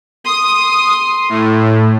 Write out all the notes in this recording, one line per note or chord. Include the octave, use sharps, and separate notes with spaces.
C6 D#6
A2